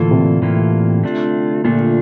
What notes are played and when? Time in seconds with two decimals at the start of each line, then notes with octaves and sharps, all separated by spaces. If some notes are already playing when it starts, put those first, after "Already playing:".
Already playing: A2 D3 E3 A#3 F4 A4
0.11 C3
0.42 A2 E3 A#3 F4 A4
1.03 D3 A3 D4 F4
1.64 A#2 D3 A3 D4 F4